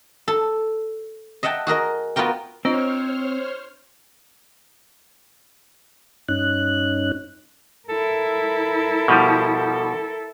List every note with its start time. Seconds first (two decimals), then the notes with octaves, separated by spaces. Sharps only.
0.28 A4
1.43 D#5 E5 F#5 G5 A5
1.67 F#4 G#4 A#4 D#5
2.16 B3 F4 F#4 A#4 G5
2.65 C4 D4 F4 C5 C#5 D#5 F6
6.29 G2 C#4 D#4 F#6
7.89 E4 A4 A#4
9.08 B2 F3 G3